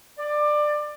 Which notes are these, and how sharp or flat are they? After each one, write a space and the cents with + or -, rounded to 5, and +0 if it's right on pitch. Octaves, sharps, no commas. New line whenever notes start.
D5 +20